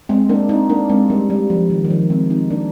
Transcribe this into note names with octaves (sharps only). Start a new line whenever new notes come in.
G#3 C4
A#3 D4
C4 D#4
A#3 D4
G#3 C4
G3 A#3
G3
F3
D#3
D#3
F3
G#3 C4
C4 D#4
A#3 D4